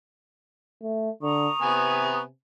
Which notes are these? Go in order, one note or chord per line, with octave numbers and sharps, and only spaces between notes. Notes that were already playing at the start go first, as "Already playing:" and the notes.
A3
D3 A#5 C#6 D#6
C3 B3 B4 G#5